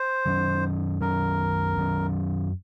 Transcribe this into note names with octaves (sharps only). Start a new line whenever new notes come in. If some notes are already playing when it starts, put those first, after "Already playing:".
Already playing: C5
F#2 D#3 F#3 C#4
F#2 D#3 F#3 C#4 A#4
F#2 D#3 F#3 C#4